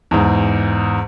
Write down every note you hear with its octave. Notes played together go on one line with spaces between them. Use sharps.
E2 G#2